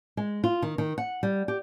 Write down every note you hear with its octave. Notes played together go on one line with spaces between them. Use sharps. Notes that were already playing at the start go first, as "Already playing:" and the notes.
G#3
F4
D#3
D#3
F#5
G3
G4